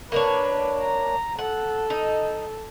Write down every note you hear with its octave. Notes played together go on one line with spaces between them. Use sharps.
A#3 D4 B4 C#5
A#5
A4 F#5
D#4